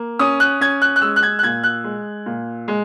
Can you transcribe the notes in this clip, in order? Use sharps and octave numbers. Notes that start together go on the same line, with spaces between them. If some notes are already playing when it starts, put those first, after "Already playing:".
Already playing: A#3
C#4 D#6
F#6
C#4 G#6
F#6
F#6
G#3 E6
F#6
G#6
F#6
A#2 G#6
F#6
G#3
A#2
G#3